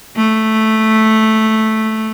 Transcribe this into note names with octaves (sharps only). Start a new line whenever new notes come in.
A3